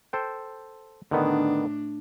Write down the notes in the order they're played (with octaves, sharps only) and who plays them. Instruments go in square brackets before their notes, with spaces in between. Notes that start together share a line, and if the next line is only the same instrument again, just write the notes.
[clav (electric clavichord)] A4 C5 G5
[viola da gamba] A2 D4 [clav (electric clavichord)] D3 D#3 B3